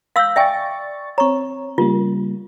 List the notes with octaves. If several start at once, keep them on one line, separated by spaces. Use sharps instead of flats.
F5 C6 E6 G6 A#6 B6
D5 E5 G5 G#5 C#6 A6
C4 C#5 A#5 C#6
C#3 G3 A#3 F4